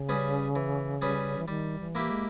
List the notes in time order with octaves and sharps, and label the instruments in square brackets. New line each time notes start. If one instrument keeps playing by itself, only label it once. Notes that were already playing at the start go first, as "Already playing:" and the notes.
Already playing: [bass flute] C#3
[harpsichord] G3 C#4 G#4 B4
E3
G3 C#4 G#4 B4
[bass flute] E3
[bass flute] D#3 [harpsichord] G3
[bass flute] E3
[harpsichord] A#3 E4 G4
[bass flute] G#3